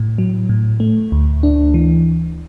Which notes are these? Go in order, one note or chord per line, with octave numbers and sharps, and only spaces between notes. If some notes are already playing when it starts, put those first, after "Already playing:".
Already playing: A2
F#3
A2
A3
D2
D4
E3